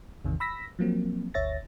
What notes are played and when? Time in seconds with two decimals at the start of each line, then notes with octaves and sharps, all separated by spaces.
0.25 A1 E2 C3 D#3
0.40 B5 E6 A#6 B6
0.79 F3 F#3 A#3 C4
1.34 G1 D2 C#5 E5 A6 A#6